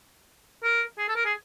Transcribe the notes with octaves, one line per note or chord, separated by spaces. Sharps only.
A#4
G#4
A4
A#4
G#4